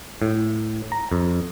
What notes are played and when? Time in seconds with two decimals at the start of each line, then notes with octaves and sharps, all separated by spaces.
0.22 A2
0.92 A#5
1.12 F2